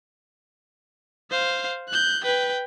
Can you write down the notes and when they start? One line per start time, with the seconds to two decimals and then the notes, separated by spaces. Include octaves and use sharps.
1.31 C5 F5
1.89 F#6 G6
2.24 B4 G5